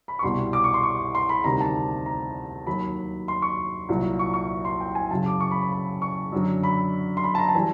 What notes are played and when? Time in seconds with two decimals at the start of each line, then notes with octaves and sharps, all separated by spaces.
0.08 B5
0.19 C#6
0.23 C2 B2 G3 C6
0.53 D6
0.64 C#6
0.74 C6
0.83 C#6
1.15 C6
1.29 B5
1.44 D2 C3 D#3 G3 A#5
1.61 A5
2.06 A#5
2.67 D#2 D#3 F#3 B5
3.28 C6
3.42 C#6
3.89 C2 A#2 F#3
4.19 C#6
4.34 C#6
4.65 C6
4.80 G5
4.95 G#5
5.11 F#2 C#3 F#3 A5
5.26 D6
5.40 C#6
5.51 B5
5.62 B5
5.72 B5
6.02 C#6
6.32 F#2 D3 F#3
6.64 B5
7.17 C6
7.24 B5
7.35 A5
7.39 A#5
7.49 A5
7.54 E3 G3 G#5